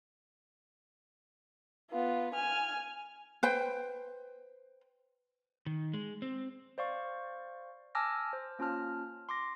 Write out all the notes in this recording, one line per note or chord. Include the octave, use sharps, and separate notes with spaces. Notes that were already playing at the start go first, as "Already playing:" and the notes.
B3 F4
G#5 F6
B4 C5 G5
D#3
G#3
C4
C5 D5 F5 C#6
G#5 A5 D6 E6 F6 A#6
C5
A#3 C#4 F4 A5 F6
C6 D6 A#6